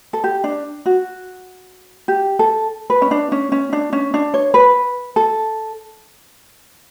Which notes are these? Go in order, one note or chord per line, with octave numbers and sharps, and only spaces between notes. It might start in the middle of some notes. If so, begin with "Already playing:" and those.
A4
G4
D4
F#4
G4
A4
B4
C#4
D4
C#4
C#4
D4
C#4
D4
C#5
B4
A4